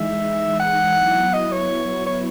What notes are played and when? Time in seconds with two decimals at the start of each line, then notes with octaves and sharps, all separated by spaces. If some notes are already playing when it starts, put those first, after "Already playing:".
Already playing: E3 G#3 D#4 E5
0.59 F#5
0.96 F#3 B3 E4
1.33 D#5
1.52 C#5
2.06 C#5